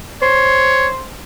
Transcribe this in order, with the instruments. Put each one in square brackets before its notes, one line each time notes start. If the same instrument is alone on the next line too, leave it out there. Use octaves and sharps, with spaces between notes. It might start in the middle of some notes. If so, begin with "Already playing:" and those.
[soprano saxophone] C5 [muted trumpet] C#5